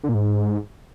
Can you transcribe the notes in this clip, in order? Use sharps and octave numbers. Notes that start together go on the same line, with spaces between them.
D3
A#2
G#2